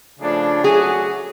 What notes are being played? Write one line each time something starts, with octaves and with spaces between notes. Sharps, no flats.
C#3 F3 A3 D4
F#3 A3 C#4 F#4 G#4